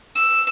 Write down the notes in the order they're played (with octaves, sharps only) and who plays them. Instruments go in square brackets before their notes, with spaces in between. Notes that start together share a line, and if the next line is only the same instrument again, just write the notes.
[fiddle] E6